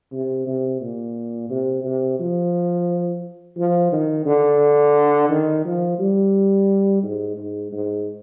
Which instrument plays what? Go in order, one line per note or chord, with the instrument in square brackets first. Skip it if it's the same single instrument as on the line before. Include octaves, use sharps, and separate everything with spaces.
[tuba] C3
C3
A#2
C3
C3
F3
F3
D#3
D3
D#3
F3
G3
G#2
G#2
G#2